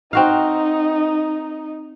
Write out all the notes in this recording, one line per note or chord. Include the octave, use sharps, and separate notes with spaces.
C4 D#4 F#4 F5